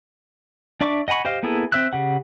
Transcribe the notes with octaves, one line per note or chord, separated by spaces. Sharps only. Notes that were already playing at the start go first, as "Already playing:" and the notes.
D4 D5 E5 C#6 D6
D#5 F#5 G#5 B5 C#6
G4 C5 D#5 F5
A#3 B3 E4 G#4 A4
C4 C5 E5 E6 F#6
C#3 G4 F#5